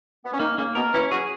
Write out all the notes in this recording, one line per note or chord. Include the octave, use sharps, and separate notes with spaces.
B3
C#4
D#3 A#3 D#4
C#3 A#3 C#4
B2 B3 A#4
E3 C#4 E4
F#3 F#4 G#4